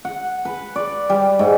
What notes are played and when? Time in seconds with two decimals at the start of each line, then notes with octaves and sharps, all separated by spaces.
0.05 F#5
0.45 B4
0.76 D5
1.10 G3
1.39 G#2